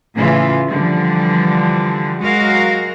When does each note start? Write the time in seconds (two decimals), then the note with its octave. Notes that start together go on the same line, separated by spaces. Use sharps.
0.14 A2 C#3 E3 F4
0.69 D3 E3 F3 G3
2.19 F#3 G#3 F#4 A#4 F5